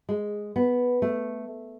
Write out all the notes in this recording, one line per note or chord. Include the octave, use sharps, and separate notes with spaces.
G#3
B3
A3